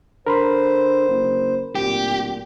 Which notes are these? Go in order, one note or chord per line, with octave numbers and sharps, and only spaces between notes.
D3 A#4 C5 B5 C6
F#1
D1 A#2 G4